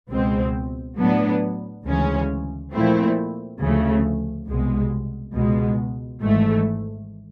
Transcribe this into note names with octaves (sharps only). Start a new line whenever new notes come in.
C#2 B2 G#3 C4
A2 F#3 B3 D4
D2 C#3 E3 G#3 C#4
A#2 F3 A3 C4 E4
D2 C#3 F3 A3
C2 B2 G#3
C#2 B2 G#3
G#1 G#2 E3 A3